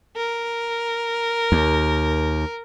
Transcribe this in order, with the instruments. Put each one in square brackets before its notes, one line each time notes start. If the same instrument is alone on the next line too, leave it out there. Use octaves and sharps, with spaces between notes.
[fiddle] A#4
[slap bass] D#2